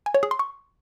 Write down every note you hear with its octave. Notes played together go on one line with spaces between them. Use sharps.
G#5
C#5
G#4
C6
C#6